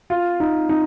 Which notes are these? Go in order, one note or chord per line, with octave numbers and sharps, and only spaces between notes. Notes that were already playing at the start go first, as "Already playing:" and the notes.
F4
D#4
D#4